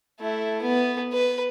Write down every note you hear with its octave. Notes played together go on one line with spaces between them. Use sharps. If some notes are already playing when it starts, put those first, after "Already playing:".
A3 E4
B3
B4